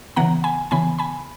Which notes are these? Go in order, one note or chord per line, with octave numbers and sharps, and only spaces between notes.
C#3 E3 B3 F#5 A#5
G#5 B5
C#3 E3 B3 G#5 B5
G#5 B5